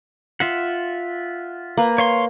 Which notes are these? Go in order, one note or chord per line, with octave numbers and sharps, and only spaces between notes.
F4 E5 F#5 C6
A#3 B4
C#5 F5 C6